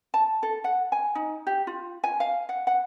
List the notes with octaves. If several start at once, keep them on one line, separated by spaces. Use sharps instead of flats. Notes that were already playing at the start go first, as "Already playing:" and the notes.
A5
A4
F#5
G#5
D#4
G4
F4
G#5
F5
F#5
F#5